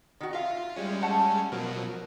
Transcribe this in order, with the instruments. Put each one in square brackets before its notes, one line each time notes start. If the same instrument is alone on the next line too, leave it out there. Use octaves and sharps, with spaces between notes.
[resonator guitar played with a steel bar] D#3 F#4
[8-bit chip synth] F4 [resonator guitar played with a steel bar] E5 F5
[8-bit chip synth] G3 G#3 C#4
[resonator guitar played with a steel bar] A3 F#5 A5
[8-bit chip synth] B2 F3 F#3 [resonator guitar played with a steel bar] A#4